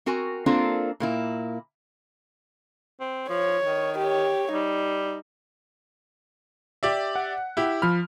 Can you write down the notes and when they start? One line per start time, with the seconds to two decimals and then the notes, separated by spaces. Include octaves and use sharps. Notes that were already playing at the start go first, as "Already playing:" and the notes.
0.06 C4 F#4 A#4 G#5
0.46 A#3 C4 D4 F4 A4 A#4
1.00 A#2 A#3 E4
3.00 C4
3.30 F3 C#5
3.63 D#3
3.98 G4 C#5
4.52 G3 D#4
6.83 G4 D5 E5
7.16 F#5
7.57 E4 G4
7.82 F3 B5 F6